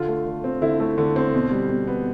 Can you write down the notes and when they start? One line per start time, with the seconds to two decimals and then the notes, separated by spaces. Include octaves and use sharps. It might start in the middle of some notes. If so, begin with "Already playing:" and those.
Already playing: D3 F4
0.08 A3
0.26 D3
0.44 C4
0.61 D3 E4
0.80 A3
0.98 D3
1.16 C4
1.33 B2
1.51 G3
1.69 B2
1.87 B3